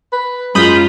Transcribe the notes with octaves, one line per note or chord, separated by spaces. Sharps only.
B4
F#2 G#3 F4 B5 D#6 G6